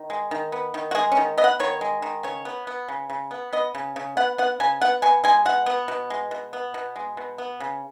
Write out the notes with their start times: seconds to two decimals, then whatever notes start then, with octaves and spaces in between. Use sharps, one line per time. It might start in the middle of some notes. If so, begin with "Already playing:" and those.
Already playing: D#3
0.10 G#3
0.31 D#3
0.52 B3
0.74 D#3
0.91 F#4
0.95 G#3 G#4
1.12 C#4
1.17 D#3
1.38 B3 D#5
1.44 F#5
1.60 D#3 C#5
1.81 G#3
2.02 D#3
2.23 C#3 C#5
2.45 B3
2.67 B3
2.88 C#3
3.10 C#3
3.31 B3
3.53 B3 D#5
3.75 C#3
3.96 C#3
4.17 B3 F#5
4.38 B3 F#5
4.60 C#3 G#5
4.81 B3 F#5
5.02 B2 G#5
5.24 G#3 G#5
5.45 B2 F#5
5.66 B3
5.88 B2
6.10 G#3
6.31 B2
6.53 B3
6.74 B2
6.96 G#3
7.17 B2
7.38 B3
7.60 C#3